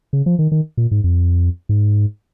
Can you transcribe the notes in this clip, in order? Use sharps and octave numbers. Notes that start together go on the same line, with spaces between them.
C#3
F3
D#3
D#3
A#2
G#2
F2
G#2